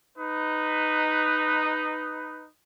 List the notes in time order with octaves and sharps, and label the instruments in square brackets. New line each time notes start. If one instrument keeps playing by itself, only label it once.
[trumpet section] D#4 B4